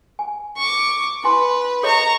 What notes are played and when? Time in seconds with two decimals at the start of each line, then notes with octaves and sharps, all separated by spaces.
0.19 G#5
0.57 C#6 D6
1.24 E4 B4 G#5 C6
1.83 A4 C#5 D#5 A#5 C#6